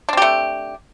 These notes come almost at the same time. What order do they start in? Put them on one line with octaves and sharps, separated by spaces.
D4 C4 G4 A3